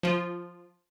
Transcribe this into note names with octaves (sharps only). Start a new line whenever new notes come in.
F3 F4